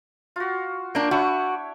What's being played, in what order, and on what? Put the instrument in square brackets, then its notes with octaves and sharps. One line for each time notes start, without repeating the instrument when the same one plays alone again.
[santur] F4 F#4
[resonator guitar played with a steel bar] A#3 D4 [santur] G5
[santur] D4 E4 C#5 [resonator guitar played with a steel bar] F#4